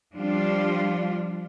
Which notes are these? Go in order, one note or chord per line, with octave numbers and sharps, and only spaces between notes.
F3 G3 D4 F4